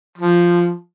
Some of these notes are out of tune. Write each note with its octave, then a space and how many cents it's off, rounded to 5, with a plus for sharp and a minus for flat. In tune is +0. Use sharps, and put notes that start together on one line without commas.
F3 -5